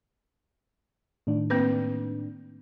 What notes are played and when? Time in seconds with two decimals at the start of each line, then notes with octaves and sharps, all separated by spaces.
1.27 A2 D#3 D4
1.50 A#3 C4 B4